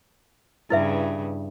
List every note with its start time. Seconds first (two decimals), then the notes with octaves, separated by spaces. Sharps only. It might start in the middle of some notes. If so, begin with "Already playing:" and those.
0.70 G2 C#3 E4 B4 E5